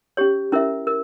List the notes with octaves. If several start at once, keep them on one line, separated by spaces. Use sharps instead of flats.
C#4 G4 C#5
C#4 E4 A#4 E5
A#4